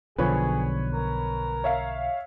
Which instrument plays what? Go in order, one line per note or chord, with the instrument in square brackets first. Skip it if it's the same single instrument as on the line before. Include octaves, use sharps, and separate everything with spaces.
[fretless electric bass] B1 D3 F3 [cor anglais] G#4 [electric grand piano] B4 C#5
[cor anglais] A#4
[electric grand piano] C#5 E5 F5